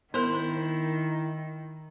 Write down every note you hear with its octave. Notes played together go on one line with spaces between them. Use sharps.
D#3 B3 E4 A#4 C5